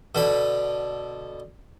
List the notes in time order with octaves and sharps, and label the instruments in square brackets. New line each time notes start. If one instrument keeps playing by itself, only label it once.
[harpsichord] B2 D3 B5